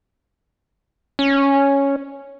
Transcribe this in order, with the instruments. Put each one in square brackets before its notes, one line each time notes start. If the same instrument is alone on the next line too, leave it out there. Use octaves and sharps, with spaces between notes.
[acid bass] C#4